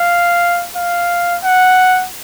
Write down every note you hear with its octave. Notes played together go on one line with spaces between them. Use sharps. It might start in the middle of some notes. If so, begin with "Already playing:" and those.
Already playing: F5
F5
F#5